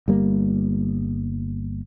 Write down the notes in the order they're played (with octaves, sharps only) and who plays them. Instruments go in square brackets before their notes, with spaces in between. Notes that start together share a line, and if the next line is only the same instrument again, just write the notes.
[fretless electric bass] G1 G3 A#3